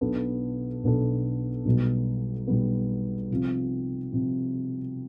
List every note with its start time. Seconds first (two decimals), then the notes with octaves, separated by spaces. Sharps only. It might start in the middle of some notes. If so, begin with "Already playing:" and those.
0.01 B1 B2 B3 D4 A4
0.84 B1 B2 B3 D4 A4
1.65 B1 B2 G3 B3
2.48 B1 B2 G3 B3
3.31 C3 F3 C4
4.12 C3 F3 C4